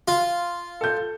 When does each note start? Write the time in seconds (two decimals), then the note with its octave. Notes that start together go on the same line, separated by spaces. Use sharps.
0.08 F4
0.81 A4 G6